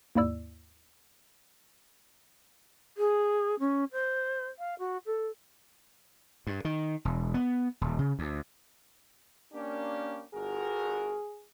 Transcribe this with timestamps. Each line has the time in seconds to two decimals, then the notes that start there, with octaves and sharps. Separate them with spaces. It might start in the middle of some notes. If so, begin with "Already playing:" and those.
0.15 D#2 G#2 A#3 E4 D5 E6
2.97 G#4
3.59 C#4
3.92 C5
4.58 F5
4.78 F#4
5.05 A4
6.47 G2
6.65 D#3
7.05 E1
7.34 B3
7.81 D#1
7.99 C#3
8.19 D2
9.53 A#3 C#4 D4 G4
10.34 G1 F#4 G#4 A#4